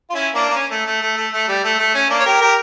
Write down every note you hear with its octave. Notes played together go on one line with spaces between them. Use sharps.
F4
C#4 E4
A#3 D4
A#3
C#4
A3
A3
A3
A3
A3
G3
A3
A3
C#4
A#3 D4
C#5
G4 A#4
G4 A#4